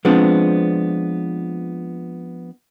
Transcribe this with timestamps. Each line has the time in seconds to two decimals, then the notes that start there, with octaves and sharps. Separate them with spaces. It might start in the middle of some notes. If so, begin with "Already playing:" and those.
0.05 F3 G#3 B3 C4 D4